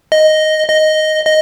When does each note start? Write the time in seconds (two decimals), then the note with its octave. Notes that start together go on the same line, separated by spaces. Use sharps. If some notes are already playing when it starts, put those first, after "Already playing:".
0.12 D#5
0.69 D#5
1.25 D#5